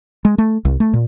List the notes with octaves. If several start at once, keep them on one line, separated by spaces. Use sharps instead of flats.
G#3
A3
C2
A3
A#2